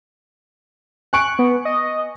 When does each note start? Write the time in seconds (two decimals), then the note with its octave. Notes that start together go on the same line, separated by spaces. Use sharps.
1.13 G#5 C#6 F#6 D7
1.39 B3
1.65 D#5